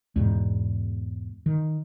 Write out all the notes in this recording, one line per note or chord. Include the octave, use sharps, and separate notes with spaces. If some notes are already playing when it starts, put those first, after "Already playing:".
E2 G#2 B2
D#3